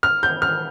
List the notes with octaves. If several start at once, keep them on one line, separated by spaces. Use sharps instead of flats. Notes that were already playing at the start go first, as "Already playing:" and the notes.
F6
G6
F6